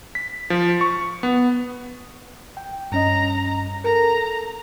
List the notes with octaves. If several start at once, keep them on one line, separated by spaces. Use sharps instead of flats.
B6
F3
C#6
B3
G5
G2 C#4 D#5 A#5
A4 A#4 A#5